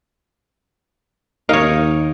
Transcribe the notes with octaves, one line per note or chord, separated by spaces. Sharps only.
D#2 D#4 A#4 C#5 D#5 F5